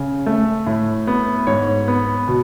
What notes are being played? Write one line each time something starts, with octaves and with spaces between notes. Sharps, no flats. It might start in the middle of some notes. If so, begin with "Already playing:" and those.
Already playing: C#3
A3
A2
B3
G#2 C#5
B3
B2